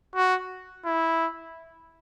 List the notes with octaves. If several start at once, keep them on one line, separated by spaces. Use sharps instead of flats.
F#4
E4